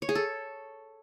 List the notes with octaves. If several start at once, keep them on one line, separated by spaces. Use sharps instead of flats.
C#5
G#4
A4